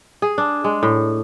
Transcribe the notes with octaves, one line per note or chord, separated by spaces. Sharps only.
G#4
D4
G#3
A2